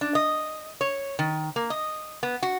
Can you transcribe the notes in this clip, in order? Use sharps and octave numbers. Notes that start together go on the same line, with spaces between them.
D4
D#5
C#5
D#3
A#3
D#5
B3
F#4